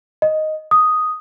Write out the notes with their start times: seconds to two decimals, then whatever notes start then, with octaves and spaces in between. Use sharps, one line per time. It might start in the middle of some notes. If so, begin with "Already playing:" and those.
0.22 D#5
0.71 D#6